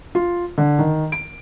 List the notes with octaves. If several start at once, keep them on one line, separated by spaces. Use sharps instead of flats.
F4
D3
D#3
D7